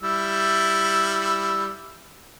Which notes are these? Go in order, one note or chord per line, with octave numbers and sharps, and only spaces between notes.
G3 E4 E6